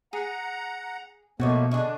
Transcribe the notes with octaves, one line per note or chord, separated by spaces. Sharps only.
G#4 F#5 A#5
B2 F3 A3 A#3 F#4 C#5 D#5
D3 D4 G#4 D#5 C#6